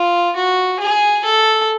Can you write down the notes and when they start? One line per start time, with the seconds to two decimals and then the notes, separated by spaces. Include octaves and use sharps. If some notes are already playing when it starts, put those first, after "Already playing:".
Already playing: F4
0.36 F#4
0.80 G#4
1.24 A4